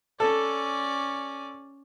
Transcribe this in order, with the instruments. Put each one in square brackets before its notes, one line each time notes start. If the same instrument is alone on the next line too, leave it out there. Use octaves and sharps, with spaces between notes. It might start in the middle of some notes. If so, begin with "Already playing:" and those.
[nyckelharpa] C#4 D5 [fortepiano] A4